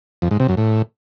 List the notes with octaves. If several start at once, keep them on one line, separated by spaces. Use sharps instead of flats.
F2
G#2
C3
F#2
A2